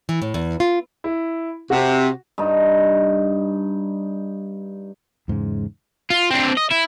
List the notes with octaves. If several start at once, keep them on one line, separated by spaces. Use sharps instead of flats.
E3
A2
E2
F4
E4
C3 F#4
G2 D#4
E2 G#2 C#3 G#3
F4
C4 D4
D#5
E4